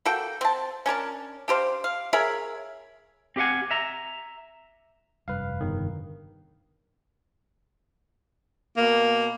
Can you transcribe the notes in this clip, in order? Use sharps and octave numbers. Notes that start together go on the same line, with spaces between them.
A#3 F#4 A4 G5
C4 A5
C#4 D4 A#4 A5
D4 G4 C5 F5
F5
G#4 A#4 C#5 E5
C4 G4 F5 F#5 G#5
E5 A#5
F1 G2 B4 F5
G1 D#3
B2 A#3